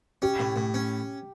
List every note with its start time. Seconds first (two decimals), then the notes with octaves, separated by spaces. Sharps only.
0.22 C#4 G4
0.40 A2
0.56 A2
0.74 C#4